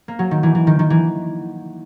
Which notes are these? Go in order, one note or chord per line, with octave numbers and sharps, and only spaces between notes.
A#3
F#3
D#3
E3
E3
D#3
D#3
E3